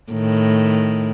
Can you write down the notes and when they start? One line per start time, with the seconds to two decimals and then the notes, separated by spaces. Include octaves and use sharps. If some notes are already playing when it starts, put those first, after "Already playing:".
0.12 A2 D#3